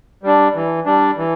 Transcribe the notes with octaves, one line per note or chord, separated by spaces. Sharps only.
G3 D4
E3
G3 D4
E3